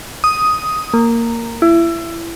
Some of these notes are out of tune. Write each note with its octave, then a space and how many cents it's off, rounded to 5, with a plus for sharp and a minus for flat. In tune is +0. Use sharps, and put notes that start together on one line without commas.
D#6 +5
A#3 -10
E4 +25